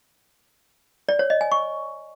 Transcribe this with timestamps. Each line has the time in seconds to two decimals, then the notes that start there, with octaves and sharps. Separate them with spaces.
1.09 D5
1.19 C#5
1.30 D#5
1.41 G#5
1.52 C#6